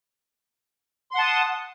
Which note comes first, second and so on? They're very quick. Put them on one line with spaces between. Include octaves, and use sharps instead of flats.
C6 F#5 A5 D#6